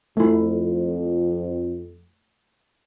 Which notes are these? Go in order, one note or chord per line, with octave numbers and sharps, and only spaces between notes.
F2 A3 E4